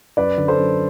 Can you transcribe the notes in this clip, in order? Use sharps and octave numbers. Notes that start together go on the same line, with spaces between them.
F#2 B4 D5
D3
A4 C5
F#2